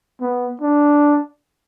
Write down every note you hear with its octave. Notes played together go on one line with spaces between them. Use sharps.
B3
D4